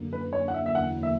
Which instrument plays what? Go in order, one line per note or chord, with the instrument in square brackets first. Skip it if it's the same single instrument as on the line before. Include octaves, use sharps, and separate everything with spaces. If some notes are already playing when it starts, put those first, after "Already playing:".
Already playing: [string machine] F#2 D3 A#3
[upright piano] B4
C#5
F#5
E5
E5
[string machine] E2 D3 F#3 A#3 E4 [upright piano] F#5
[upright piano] E5